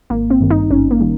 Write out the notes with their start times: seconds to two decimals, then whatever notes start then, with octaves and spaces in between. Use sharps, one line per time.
0.10 G#1 A#3
0.30 C4
0.41 G2 D#3 G3
0.50 D#4
0.71 G#1 C#4
0.91 A#3
1.01 D#3 G3